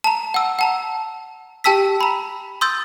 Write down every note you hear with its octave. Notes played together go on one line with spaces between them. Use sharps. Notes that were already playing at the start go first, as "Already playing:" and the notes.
A5 A#5
F#5 E6
F#5 A5 A#5
G4 G5 A5 E6 B6
A#5 B5
C6 D#6 E6 G6 A6